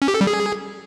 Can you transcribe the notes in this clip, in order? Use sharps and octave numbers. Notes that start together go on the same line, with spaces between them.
C#4
G4
A4
G3
G#4